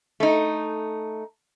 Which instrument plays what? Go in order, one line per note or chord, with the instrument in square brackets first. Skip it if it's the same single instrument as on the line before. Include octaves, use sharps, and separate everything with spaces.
[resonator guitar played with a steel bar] A3 D#4